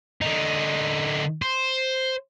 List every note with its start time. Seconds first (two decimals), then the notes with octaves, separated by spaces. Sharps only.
0.21 D3 D#4
1.42 C5